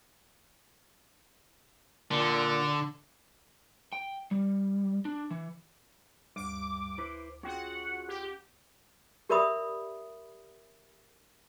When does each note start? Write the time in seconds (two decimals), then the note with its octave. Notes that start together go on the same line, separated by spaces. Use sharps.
2.11 A#2 D3
3.93 G5
4.31 G3
5.05 D4
5.30 E3
6.36 D2 G2 D6
6.98 E4 B4 C5
7.43 C#4 F4 F#4 G#4 F#5 G5
8.09 G4
9.29 G4 A#4 D5 E5 B5 D#6